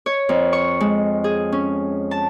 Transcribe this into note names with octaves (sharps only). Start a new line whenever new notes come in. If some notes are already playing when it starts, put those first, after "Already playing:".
C#5
F2
C#6
G#3
G#4
C#4
A5